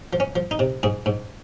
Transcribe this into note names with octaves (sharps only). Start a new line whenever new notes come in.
F3
C#4
F3
D#4
C3
G#2 G#4
G#2